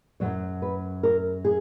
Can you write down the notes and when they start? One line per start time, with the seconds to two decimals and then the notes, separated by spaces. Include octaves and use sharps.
0.20 F#2 D#3 F#3 C#5
0.62 B4
1.03 A#4
1.45 G#4